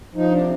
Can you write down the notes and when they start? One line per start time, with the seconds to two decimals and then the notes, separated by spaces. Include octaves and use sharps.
0.15 F3 D#4
0.31 C3 D4